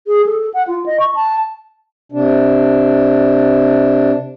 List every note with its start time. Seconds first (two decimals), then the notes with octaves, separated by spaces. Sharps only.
0.07 G#4
0.26 A4
0.54 F#5
0.68 F4
0.86 D#5
1.00 C#6
1.15 A5
2.12 C3 D4